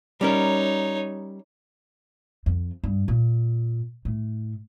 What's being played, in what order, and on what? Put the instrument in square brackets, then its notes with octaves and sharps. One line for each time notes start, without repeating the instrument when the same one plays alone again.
[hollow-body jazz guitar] G3 C#4 A#4 [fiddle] D#4 C#5
[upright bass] F2
G2
A#2
A2